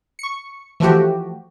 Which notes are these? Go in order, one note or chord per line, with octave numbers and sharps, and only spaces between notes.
C#6 C#7
E3 F3 A3 F#4 G4